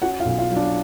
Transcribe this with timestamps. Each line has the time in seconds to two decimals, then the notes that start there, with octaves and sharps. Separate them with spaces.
0.02 C#4 F#4 F#5
0.20 F4 F5
0.25 B1
0.38 F4 F5
0.50 F#3
0.56 D4 D5